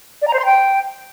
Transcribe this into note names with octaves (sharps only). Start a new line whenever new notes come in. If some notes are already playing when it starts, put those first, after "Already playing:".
D5
A#5
C5
C6
G5